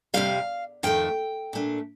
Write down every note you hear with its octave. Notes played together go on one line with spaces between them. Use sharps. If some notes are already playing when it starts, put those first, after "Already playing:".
F2 C3 D#3 G3 F5
F2 D#3 A3 G5
A#2 A3 D4